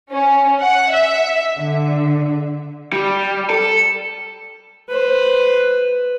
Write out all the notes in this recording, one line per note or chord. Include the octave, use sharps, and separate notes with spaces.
C#4
F#5
E5
D3
G3
A4
B4 C5